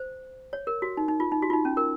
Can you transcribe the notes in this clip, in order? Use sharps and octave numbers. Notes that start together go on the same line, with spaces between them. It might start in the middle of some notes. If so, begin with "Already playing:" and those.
Already playing: C5
C#5
A#4
F#4
D#4
D#4
F4
D#4
F#4
F4
D#4
C#4
A#4